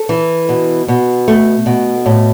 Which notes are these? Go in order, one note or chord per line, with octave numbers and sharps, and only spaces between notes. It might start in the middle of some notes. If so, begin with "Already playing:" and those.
Already playing: A4
E3
B2
B2
A3
B2
A2